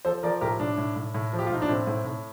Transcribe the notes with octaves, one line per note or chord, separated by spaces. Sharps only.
F3 A4 C5
F3 A#4 D5
A2 G4 A#4
A2 D4
A2
A2
A2
F3
G4
F4
A2 D#4
D4
A2 C4
A2
A2